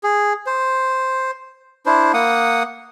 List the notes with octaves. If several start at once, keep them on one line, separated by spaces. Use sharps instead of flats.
G#4
C5
D4 E4 C5
A#3 F#5 D#6